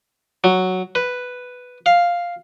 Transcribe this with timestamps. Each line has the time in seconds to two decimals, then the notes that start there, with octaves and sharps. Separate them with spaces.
0.44 F#3
0.95 B4
1.86 F5